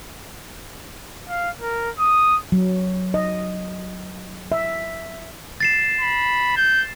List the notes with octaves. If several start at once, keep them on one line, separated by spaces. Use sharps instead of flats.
F5
A#4
D#6
F#3
D#5
E5
A6 C7 E7
B5
G6